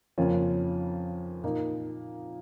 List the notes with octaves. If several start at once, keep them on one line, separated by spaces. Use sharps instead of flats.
F2 C#3 A#3 C#4 F4
A#2 A#3 D#4